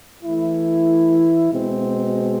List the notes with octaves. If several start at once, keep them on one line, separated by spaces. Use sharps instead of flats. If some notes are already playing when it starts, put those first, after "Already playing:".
E3 A3 E4
B2 G#3 C4